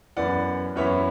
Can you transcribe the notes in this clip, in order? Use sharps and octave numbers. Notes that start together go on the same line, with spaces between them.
F#2 E3 B3 D5 F#5
F#2 E3 B3 C#5 E5